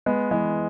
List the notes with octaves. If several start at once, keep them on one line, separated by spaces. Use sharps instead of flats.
G#3 B3
E3 G#3